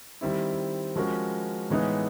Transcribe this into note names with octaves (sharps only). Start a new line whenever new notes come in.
D#3 G3 C4 E4
F3 G#3 C#4 F#4 A#4
A2 E3 G#3 B3 D#4